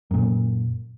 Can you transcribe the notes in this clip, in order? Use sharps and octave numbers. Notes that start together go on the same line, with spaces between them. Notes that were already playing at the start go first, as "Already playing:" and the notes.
F#2 A#2